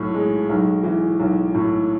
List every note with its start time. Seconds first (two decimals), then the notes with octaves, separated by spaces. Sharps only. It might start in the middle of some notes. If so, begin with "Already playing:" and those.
Already playing: B1 A2
0.14 G#3
0.50 B1
0.83 E3
1.20 B1
1.54 A2